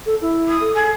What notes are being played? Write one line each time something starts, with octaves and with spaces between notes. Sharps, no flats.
A4
E4
D#6
A4
G#4